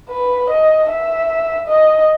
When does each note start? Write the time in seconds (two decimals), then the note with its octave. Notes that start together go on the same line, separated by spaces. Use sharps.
0.09 B4
0.49 D#5
0.89 E5
1.67 D#5